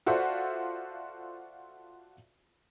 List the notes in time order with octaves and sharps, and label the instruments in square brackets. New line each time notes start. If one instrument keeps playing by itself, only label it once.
[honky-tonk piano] F4 F#4 A4 C5 D5 E5